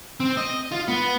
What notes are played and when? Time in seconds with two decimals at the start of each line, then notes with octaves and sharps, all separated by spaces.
0.20 C4
0.37 D#5
0.72 F4
0.89 B3